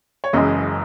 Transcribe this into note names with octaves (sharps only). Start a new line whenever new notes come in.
C#5
F#1 F#2 C#3 E3 G#3 D#5